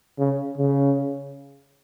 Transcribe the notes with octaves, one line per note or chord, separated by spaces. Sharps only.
C#3
C#3